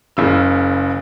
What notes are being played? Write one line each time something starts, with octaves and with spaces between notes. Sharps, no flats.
F#1 C#3 E6